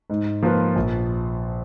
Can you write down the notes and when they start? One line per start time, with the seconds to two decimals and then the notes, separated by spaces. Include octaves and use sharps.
0.10 G#2
0.43 F3 A#3 F4 B4
0.76 A#1